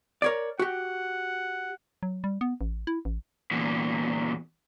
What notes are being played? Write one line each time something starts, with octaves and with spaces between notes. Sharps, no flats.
A#4 C#5 D5
F#4 G4 F#5
F#3
G3
B3
A1
E4
A1
E2 A#2